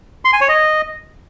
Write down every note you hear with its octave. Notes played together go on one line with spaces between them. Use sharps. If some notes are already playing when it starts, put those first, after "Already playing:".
C6
G#5
C#5
D#5